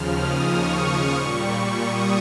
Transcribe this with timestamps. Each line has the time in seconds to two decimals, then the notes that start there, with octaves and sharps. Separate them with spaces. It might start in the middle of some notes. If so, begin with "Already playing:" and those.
Already playing: D#2 C#3 F3 F6
0.16 D#6
0.49 C#6
1.15 A#2 G3
1.81 D#6